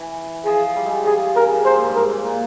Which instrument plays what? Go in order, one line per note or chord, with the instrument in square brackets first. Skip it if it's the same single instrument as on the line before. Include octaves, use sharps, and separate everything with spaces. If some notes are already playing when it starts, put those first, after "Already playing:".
Already playing: [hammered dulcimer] E3
[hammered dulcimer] F3 [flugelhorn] G#4
[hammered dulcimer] G3
G#3
G3
[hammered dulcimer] F3 [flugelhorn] G#4
[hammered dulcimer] C#3 [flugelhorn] A#4
[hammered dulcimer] C#3
[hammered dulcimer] A#2 [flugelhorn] C5
[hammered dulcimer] G#2
G2
[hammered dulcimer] G#2 [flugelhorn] A#4
[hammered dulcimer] A#2
A#2